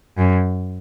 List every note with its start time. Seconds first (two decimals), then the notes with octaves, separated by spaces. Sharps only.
0.18 F#2